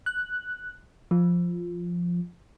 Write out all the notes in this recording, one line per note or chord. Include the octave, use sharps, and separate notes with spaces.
F#6
F3